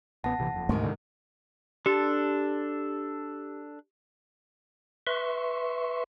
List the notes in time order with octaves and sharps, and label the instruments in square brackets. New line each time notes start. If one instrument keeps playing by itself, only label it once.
[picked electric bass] A1 B3 [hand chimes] F#5 A5 A#6
[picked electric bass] A#1 C3 E3
F#1 F2
[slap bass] D2 G#3 A3 [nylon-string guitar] G#2 C3 D#3
[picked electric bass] A2 D3
[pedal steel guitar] D4 A4 [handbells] G4
[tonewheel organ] B4 E5 C6 C#6